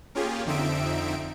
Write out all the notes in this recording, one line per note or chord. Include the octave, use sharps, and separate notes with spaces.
A#3 C#4 F4 G4 G#4
F2 D3 C4 D#4 E5 D7